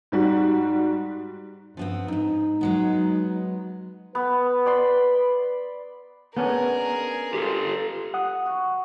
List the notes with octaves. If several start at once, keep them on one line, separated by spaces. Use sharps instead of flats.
G#2 G3 F#4
G2 F3 B3 C4
F2 G#2 D#4
F#3 G#3 B3
B3 B4
D5 B5 C6
B3 C#4 D4 G#4 A#4
F4 G4 A4
F#5 D#6
F#4